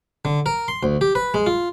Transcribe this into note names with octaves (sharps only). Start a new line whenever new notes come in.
D3
A#4
C6
D2
G4
B4
G#3
F4